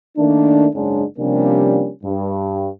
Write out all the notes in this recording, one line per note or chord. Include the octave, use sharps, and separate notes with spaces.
D#3 A3 A#3 D4
F#1 G#2 G#3 C#4 D4
C3 F3 G3 A#3 C#4 D4
G2